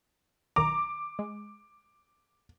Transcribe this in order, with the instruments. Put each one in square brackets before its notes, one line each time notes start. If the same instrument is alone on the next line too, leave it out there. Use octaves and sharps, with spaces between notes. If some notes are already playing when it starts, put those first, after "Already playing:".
[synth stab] B1 D#3 A#5 [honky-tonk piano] D6
[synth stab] G#3